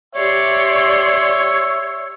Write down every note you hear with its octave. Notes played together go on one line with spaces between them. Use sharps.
G4 C#5 D5 E5 C6